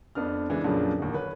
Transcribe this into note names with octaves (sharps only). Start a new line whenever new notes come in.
F2 B3 D4 F6
C#3 E3 G#3 B3 D4
F2 A#2 C#3 F3 F#3 D4
D1 D#2
B4 C#5